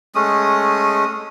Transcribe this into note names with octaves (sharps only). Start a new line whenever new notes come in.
G#3 A3 C#4 D#6